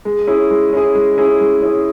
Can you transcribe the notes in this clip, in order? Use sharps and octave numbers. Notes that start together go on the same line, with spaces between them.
G#3
C#4 E4 G#4
G#3
C#4 E4 G#4
G#3
C#4 E4 G#4
G#3
C#4 E4 G#4